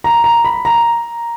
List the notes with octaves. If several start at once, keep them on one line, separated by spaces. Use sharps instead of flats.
A#5
A#5
B5
A#5